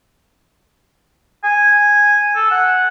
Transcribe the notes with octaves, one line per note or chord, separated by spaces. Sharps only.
G#5
A4
F#5